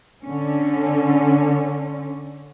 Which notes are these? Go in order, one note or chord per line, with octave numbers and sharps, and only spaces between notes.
D3 C#4